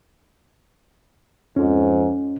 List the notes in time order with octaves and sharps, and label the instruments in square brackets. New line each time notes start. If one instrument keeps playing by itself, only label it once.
[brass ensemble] F2 G#2 [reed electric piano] C#4